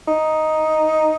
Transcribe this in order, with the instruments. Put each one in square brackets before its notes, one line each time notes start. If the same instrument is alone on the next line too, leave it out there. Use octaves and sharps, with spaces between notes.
[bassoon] D#4